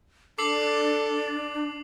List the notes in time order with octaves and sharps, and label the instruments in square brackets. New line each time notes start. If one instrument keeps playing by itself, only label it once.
[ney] D4 [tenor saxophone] A4 [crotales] D6 C7 F#7